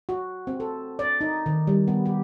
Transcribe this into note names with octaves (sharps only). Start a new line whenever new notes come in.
F#4
C4
A4
D5
D#4
D#3
G3
B3
G4